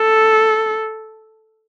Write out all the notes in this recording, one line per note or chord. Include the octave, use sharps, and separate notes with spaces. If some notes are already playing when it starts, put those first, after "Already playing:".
Already playing: A4